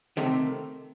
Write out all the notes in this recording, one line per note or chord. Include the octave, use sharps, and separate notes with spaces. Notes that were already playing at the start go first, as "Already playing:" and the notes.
C3 D#3 A3